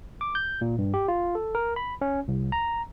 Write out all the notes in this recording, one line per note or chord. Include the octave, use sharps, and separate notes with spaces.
D6
G6
A#2
G2
G4
F4
A4
A#4
B5
C#4
C2
A#5